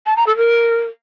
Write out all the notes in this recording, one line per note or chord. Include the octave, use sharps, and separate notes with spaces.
A5
A#5
A4
A#4